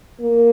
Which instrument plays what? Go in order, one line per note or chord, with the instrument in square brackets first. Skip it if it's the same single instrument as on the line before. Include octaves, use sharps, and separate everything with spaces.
[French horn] A#3